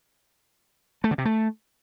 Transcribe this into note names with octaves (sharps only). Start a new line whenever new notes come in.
A3
D3
C3
A3